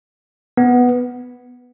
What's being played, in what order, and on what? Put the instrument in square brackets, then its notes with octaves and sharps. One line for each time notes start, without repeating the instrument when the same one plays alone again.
[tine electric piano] B3